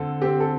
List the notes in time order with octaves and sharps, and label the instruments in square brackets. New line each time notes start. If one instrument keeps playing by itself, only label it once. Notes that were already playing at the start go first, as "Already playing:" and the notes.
Already playing: [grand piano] D3 C4 A4
[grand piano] C4 A4 [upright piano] G4
[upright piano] A4